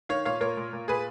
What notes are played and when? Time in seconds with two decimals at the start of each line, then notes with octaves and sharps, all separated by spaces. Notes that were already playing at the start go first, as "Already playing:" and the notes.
0.09 D#3 C#5 F5
0.25 A#2 C#5 F5
0.41 A#2 A#4 C#5
0.57 A#2
0.73 A#2
0.88 A#2 G#4 B4